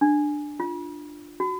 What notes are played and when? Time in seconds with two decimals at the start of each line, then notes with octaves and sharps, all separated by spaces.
0.01 D4
0.60 F4
1.40 F#4